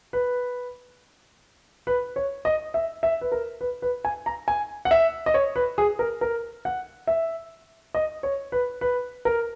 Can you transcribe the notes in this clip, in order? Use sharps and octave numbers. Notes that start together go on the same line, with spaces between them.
B4
B4
C#5
D#5
E5
E5
B4
A#4
B4
B4
G#5
A#5
G#5
F#5
E5
D#5
C#5
B4
G#4
A#4
A#4
F#5
E5
D#5
C#5
B4
B4
A#4